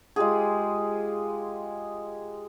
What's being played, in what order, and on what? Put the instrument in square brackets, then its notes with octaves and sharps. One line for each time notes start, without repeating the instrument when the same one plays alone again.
[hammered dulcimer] G#3 F4 G4 G#4